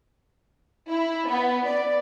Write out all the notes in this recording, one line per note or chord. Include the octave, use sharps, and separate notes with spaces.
E4
B3
D5